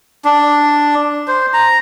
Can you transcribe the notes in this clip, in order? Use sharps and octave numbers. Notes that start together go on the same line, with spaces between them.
D4
C5
A#5